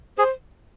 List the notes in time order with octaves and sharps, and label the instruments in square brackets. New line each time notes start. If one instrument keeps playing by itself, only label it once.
[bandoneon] G#4 [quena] C5